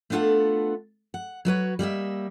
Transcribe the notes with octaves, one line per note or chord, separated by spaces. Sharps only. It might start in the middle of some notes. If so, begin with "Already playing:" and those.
A3 B3 D4 F4 A4 F#5
F#5
F#3 F#4 B4 C#5
G3 A#3 D#5 E5